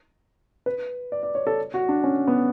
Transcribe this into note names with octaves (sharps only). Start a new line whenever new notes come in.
B4
D5
D5
C#5
A4
F#4
D4
C#4
B3